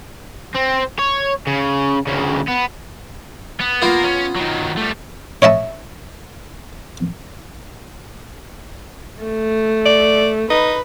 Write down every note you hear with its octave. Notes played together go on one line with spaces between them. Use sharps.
C4
C#5
C#3
D2 C#3
B3
B3
A#3 B3 F4 A#4
C#4
D#3 F#3
G3 A3
C#5 D#5 E5 A5
A3
D5
D#4 B4